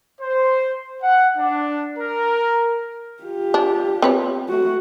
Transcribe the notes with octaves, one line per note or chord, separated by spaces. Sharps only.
C5
F#5
D4
A#4
F4 G4
D4
C4 B4 C#5
A3 F#4